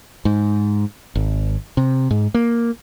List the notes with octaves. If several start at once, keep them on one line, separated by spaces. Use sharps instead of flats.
G#2
G#1
C3
G#2
A#3